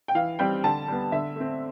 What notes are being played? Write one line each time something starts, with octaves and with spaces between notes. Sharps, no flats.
G5
E3 F5
G3 C4 G5
D3 A5
G3 B3
D3 E5
A3 C4